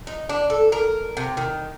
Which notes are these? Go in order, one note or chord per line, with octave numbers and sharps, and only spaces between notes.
D#4
D4
A4
A#4
C3
D#3